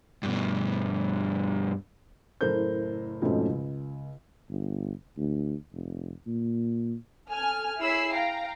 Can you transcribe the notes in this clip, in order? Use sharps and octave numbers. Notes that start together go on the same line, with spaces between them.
G2 B2
F#1 A2 A4 A#4 C5 G6
F2 G#2 B2 A3 C#4
C#2
G1
D2
F1
A#2
A4 G#5 F6
E4 G#4 C#5 B5 E6 C7
F5 G5 A#5